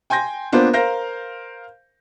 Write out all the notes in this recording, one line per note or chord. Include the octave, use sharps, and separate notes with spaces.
G5 G#5 C6 G6 A#6
A#3 B3 D4 F4 C5
A#4 C5 F5 G6 A#6